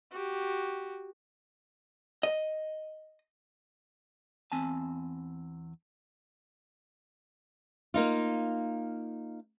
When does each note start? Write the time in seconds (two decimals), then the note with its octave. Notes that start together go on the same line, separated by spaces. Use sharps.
0.12 F#4 G4
2.23 D#5
4.52 E2 C4 G#5 A5
7.94 A#3 D#4 F4